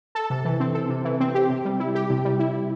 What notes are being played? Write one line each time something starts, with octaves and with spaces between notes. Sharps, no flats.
A4
C3
E3
C4
A4
C3
E3
C4
G4
C3
G3
E4
G4
C3
G3
E4